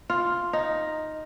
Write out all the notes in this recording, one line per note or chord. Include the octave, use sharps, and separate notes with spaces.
F4
D#4